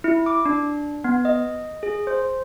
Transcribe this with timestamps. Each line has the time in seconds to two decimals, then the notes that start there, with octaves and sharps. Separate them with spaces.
0.04 E4
0.26 D6
0.45 D4
1.04 B3
1.25 D#5
1.83 G#4
2.07 C5